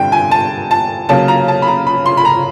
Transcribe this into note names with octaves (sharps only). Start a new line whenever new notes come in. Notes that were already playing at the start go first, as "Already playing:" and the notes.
Already playing: G2 D3 G3 C4 G5
G#5
A5
A5
C#3 F#3 A#3 A5
A#5
A5
B5
A#5
B5
C6
B5
A#5